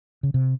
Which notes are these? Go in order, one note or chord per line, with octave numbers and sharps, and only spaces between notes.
C#3
C3